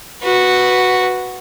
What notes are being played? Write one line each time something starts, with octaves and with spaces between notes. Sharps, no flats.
F#4 B4